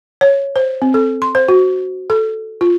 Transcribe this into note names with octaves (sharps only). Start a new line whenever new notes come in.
C#5
C5
C4
A4
C6
C5
F#4
A4
F4